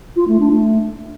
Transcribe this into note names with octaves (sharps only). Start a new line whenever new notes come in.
F4
A3
D4
A3